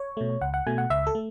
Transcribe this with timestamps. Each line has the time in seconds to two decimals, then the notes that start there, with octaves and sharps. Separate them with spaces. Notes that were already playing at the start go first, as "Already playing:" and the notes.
Already playing: C#5
0.17 B2 A3
0.41 C#2 F#5
0.54 F#5
0.67 B2 A3 G#5
0.78 F#5
0.90 C#2 E5
1.07 A4
1.15 A3